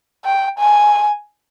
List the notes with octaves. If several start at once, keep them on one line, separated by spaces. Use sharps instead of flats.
G5
G#5